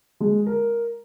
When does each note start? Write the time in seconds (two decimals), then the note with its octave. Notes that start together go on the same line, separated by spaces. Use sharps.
0.20 G#3
0.47 A#4